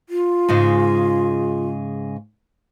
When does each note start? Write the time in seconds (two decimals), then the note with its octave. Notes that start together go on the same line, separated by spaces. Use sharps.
0.09 F4
0.49 G#2 C#3 G#3